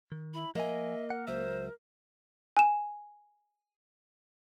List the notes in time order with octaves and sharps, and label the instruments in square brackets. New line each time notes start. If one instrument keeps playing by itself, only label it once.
[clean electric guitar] D#3
[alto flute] E4 [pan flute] B5
[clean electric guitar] F3 G#5 [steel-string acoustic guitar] A#3 [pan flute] D#5 [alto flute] E5
[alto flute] A#4 [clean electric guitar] F#5
[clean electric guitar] C#2 F#3 E5 [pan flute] C5
[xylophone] G#5 E7